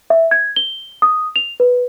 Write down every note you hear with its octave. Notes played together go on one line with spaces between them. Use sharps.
E5
G#6
G7
D#6
F7
B4